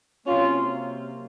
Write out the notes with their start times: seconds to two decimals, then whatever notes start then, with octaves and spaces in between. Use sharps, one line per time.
0.26 C3 F#3 A#3 C#4 F4